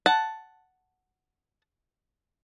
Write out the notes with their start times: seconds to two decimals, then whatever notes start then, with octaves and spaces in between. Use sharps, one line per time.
0.06 F#5 A5